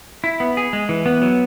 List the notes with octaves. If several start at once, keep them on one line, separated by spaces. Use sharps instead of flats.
E4
B3
G#4
G#3
E3
B3
F#3